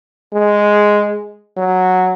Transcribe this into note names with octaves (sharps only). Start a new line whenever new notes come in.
G#3
F#3